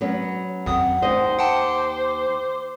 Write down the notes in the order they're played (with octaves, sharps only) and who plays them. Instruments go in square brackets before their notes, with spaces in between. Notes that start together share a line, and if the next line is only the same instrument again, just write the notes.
[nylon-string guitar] F#3 B3 C#4
[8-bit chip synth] G#1 F2 D#6 [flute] F#5
[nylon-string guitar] D#2 D#5 [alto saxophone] C5
[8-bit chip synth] F#5 G5 A5 [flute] D6